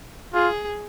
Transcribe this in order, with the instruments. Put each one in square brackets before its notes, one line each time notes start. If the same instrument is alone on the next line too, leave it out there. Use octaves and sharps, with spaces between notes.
[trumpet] F4 [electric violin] G#4